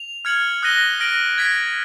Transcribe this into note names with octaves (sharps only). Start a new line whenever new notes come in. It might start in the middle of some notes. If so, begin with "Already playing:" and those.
Already playing: F7
F6 G#6 C#7 F#7
D#6 F#6 A#6 D#7 G7
F6 A#6 D7 F#7
G#6 B6 D7